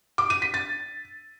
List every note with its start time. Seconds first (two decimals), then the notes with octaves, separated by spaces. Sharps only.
0.18 D6
0.30 D#7
0.42 B6
0.54 A6